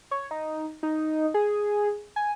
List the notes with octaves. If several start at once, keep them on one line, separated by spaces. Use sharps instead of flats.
C#5
D#4
D#4
G#4
G#5